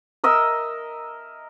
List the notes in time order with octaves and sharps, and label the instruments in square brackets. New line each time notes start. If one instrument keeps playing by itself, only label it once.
[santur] A#4 D#5 E5 E6